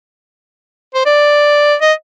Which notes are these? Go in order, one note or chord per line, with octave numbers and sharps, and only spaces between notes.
C5
D5
D#5